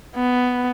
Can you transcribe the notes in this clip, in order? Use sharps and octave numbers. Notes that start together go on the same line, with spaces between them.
B3